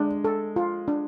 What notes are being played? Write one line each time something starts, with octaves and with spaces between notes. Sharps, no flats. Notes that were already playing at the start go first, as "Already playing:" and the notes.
Already playing: G#3 D4
A4
F4
D4